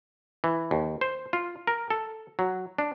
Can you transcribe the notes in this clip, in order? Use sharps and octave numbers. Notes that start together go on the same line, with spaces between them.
E3
D#2
C5
F4
A#4
A4
F#3
D4